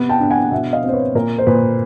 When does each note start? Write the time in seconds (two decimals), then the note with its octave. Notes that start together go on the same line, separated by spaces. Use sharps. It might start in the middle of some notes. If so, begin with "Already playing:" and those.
Already playing: C3 B3
0.09 G5 A5
0.20 D4
0.30 F#5 G#5
0.51 B2 E5 F#5
0.73 D#5 F5
0.84 C4 C5
0.93 B4 C#5
1.15 A#2 A#4
1.38 C5
1.47 A#2 B4